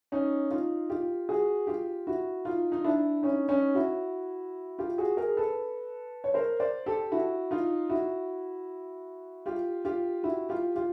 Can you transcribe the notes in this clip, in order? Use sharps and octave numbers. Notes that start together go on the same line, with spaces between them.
C#4 D#4
D#4 F4
F4 G4
F#4 G#4
F4 G4
E4 F#4
D#4 F4
D#4
D4 E4
C#4 D#4
C#4 D#4
E4 F#4
F4 G4
F#4 G#4
G#4 A#4
A4 B4
C#5
A#4 C5
C5 D5
G4 A4
E4 F#4
D#4 F4
E4 F#4
F4 G4
F4 G4
E4 F#4
F4 G4
F4 G4